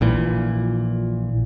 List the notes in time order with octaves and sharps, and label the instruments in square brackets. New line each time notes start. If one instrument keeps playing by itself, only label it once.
[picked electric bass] A#1 A#2 E3